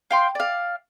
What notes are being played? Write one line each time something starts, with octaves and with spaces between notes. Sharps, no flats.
F5 G5 C6
D5 F5